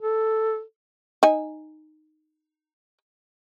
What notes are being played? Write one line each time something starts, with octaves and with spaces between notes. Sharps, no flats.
A4
D#4 G#5